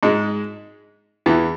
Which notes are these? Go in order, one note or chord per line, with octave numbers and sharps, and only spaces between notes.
G#2 G#3
E2 E3